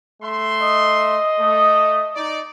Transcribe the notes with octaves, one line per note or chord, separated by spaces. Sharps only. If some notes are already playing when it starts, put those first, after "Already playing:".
A3 E5 C6
D#5
A3
D#4 D5